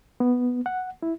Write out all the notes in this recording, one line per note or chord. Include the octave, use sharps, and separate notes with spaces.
B3
F#5
E4